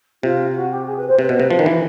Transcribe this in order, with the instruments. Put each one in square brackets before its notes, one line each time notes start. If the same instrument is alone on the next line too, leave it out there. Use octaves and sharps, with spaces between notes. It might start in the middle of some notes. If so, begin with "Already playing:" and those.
[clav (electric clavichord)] C3 [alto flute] F4
[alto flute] F#4
G4
G#4
B4
C5
[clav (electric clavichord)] C3 [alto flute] B4
[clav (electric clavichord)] B2
[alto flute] B4
[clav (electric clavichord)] C3
F3
D#3
E3